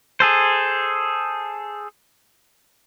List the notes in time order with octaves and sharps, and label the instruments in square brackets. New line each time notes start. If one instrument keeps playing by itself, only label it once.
[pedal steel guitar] G#4 A4 C5